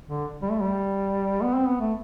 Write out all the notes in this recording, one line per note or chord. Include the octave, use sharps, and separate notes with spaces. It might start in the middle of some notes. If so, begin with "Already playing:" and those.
D3
G3
A3
G3
B3
C4
B3
A3